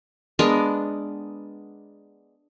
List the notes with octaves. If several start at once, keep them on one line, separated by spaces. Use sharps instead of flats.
G#3 B3 D4 A#4